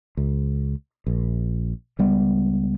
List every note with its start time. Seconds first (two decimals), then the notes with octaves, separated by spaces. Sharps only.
0.17 C#2
1.06 A#1
1.99 C#2 G3 B3